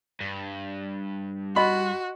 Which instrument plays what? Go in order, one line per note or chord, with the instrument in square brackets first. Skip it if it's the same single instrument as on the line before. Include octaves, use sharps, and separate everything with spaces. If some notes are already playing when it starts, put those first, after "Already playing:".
[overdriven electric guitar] G2
[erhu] F#4 [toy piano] D#5 C6 [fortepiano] B5